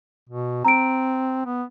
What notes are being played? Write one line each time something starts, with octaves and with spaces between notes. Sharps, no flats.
B2
C4 A#5 D7
B3